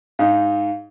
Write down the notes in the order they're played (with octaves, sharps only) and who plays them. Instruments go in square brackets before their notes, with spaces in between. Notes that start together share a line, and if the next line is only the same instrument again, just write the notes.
[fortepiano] G#2 D#4 [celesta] F5